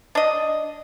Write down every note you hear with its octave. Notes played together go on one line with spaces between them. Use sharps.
D4 D#5